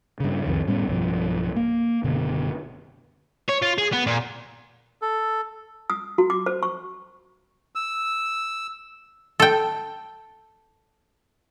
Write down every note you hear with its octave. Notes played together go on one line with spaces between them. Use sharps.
G2 C#3
C2 F2 D#3
A2 G3 B3 C#4
B1 G2 F3
A#3
F#1 B2 D3
C#5
F4
G#4
B3
A#2
A4
D#6
F#4
D6
C5
C#6
E6
A4 G5